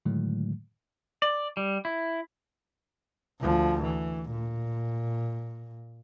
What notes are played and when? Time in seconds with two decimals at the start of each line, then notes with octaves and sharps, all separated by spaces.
0.05 A2 D3 D#3 F#3 G#3 A3
1.22 D5
1.57 G3
1.85 E4
3.41 D2 F3
3.83 E3
4.31 A#2